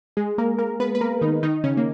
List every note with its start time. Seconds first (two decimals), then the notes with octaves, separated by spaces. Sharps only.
0.17 G#3 G#4
0.38 A#3 A#4
0.58 A#3 A#4
0.80 B3 B4
0.95 B4
1.01 A#3 A#4
1.21 D#3 D#4
1.43 D#3 D#4
1.64 C#3 C#4
1.77 A#3